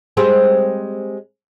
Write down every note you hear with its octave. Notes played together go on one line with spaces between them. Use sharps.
G3 G#3 C4